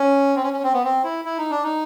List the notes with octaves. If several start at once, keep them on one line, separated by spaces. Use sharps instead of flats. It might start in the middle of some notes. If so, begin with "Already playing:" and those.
Already playing: C#4
C4
C#4
C#4
C4
B3
C4
E4
E4
D#4
D4
D#4